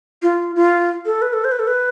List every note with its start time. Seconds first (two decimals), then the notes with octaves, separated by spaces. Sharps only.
0.22 F4
0.56 F4
1.06 A4
1.22 B4
1.33 A4
1.44 C5
1.52 B4
1.59 A4
1.67 B4